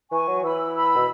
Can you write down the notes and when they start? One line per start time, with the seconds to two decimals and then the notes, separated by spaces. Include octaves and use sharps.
0.11 E3 G#5 C#6
0.27 F#3
0.43 E3 B5 E6
0.75 B5 E6
0.96 B2